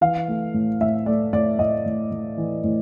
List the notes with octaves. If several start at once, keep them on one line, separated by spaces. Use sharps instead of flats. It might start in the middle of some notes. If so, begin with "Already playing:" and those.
E3 F5
A3
A2
A2 E5
A3 D5
A2 D5
A2 D#5
A2
A2
E3
A2